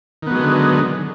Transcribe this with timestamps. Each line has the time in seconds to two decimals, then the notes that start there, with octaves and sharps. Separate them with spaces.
0.22 D#3
0.27 B3
0.31 F#3
0.35 G#3
0.39 D3